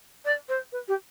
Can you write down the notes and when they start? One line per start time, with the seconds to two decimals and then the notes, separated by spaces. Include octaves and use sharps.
0.25 D5
0.48 C5
0.72 B4
0.87 G4